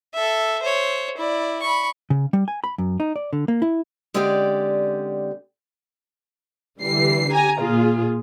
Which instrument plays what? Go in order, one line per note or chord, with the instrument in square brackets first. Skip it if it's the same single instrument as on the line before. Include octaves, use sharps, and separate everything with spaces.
[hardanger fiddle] A4 E5
C5 C#5
E4 D5
B5 C#6
[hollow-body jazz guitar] C#3
G3
G#5
B5
F#2
D#4
D5
D3
A#3
E4
[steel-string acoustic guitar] D3 G#3 C4 C#4 G4 D5
[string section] D3 E3 G3 C7
G4 G#5 A#5
A#2 F4 G#4